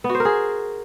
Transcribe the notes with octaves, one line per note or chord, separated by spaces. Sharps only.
B3
F#4
C5
A#4
G#4